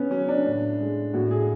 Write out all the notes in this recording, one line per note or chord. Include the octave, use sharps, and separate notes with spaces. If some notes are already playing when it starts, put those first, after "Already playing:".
Already playing: C#3 B3 C#4
F#3 C#4
D4
A2
G#3
A2 F#4
G#4